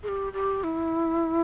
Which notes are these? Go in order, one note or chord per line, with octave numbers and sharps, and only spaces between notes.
G#4
G4
G4
E4